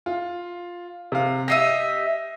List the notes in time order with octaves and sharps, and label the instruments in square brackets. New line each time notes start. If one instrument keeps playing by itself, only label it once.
[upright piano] F4
C3 F5
[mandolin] G4 D#5 E5 [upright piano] A#6 C7 D#7